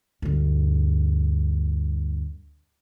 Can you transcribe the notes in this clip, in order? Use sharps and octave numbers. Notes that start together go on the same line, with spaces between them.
D2 G2